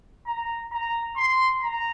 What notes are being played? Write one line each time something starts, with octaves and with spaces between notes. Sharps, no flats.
A#5
A#5
C6
A#5